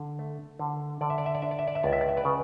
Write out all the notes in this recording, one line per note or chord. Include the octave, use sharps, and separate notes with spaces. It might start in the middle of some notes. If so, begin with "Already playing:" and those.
Already playing: D3
A3
D3
D3 D5
E5
D5
E5
D5
D4 E5
D5
E5
D5
E5
C#2 D5
E5
D5
E5
B4 D5
C#3